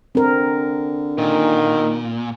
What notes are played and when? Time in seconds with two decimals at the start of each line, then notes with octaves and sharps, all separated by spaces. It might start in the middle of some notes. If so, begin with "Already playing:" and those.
0.15 D3 C4 A#4
1.18 A#2 D#3